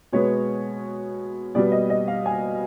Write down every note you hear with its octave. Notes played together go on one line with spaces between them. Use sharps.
B2 G#3 B3 C#5
B2 G3 B3 D5
D#5
D#5
F5
G#5